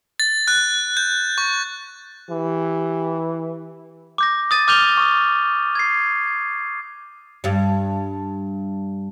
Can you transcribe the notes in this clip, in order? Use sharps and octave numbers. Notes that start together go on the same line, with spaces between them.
A6
F#6
G6
C#6
E3 G4
D6 G6 A#6
D#6 A6 D#7
D6 F6 G6 D#7 F7 G7
C#6 D#6
G#6 C7
G2 G3